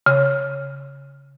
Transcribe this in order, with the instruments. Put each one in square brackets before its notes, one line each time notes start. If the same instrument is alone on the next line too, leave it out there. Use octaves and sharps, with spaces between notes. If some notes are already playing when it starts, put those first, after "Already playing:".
[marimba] C#3